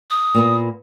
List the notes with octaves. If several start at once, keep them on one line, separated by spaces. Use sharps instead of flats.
D#6
A#2 A#3 B3